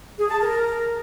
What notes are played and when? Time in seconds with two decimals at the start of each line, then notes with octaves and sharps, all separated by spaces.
0.20 G#4
0.30 A5
0.40 A#4